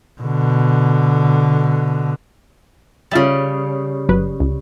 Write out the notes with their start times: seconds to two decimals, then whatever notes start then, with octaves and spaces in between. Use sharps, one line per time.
0.21 B2 D3
3.11 C#3 G3 F4 E5 A6
4.09 G1 F#3 B4
4.40 C#2